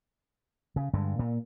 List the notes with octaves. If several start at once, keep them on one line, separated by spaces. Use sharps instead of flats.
C#3
G2 D3 G#3
A#2